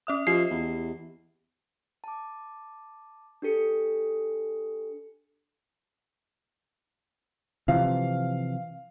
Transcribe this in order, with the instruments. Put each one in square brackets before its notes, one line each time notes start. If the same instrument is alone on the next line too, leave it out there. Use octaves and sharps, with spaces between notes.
[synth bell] C#4 E5 D#6
[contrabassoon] F3 [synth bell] G4 D#5 [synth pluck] C7
[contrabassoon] E2
[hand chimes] A5 D6
D4 G4 A4 C#7
[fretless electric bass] C3 E3 F3 [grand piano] F5